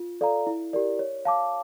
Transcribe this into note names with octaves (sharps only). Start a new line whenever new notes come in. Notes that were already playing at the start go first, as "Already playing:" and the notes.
Already playing: F4
A4 D5 F5 A#5
E4
G4 A#4 D5
C#5
F5 A5 D6